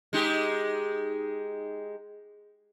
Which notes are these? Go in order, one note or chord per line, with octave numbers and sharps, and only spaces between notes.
G#3 D#4 G4